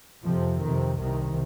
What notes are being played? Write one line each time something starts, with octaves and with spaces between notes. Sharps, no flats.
F2 C3 F3
F2 C3 D#3
C2 C3 D#3